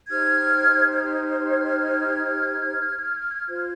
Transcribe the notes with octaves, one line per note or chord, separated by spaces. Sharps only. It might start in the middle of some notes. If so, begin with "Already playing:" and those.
D#4 G4 C5 F6 G#6
F6 G#6
F4 C5